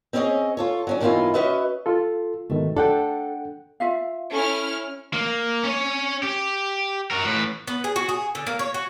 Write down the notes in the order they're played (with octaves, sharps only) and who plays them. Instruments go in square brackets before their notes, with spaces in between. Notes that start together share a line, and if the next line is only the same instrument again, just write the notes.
[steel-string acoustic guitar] C4 C#4 E4 G#4 C#5 D#5
F4 A4 C#5
F#3 C#4 D4
F#2 B2 D#3 E4 F4 G#5
C#4 F#4 B4 D#5 E5
[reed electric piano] F4 A4
[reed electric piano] G#2 B2 D#3 [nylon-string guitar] A3
[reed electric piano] D4 F#5 G5 [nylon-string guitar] A4
[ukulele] F4 E5 F5
[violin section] C#4 E4 F6 [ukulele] A4
[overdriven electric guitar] A#3
C#4 C#5
G4
F#4 A#4
A2 B4
[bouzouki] B3
G#4
F#4
G#4
D3
A#3
C#5
F#4